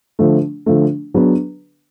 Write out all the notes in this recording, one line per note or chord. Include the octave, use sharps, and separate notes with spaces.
D3 F3 A3
D3 F3 A3
F#3 B3 D4 G#4 B4